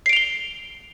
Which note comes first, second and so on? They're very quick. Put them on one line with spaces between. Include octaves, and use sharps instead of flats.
C7 D7 F7 G7